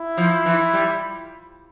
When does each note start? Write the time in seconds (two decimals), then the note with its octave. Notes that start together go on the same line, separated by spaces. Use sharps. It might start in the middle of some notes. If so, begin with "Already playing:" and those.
Already playing: E4
0.17 F3
0.46 E3
0.73 G3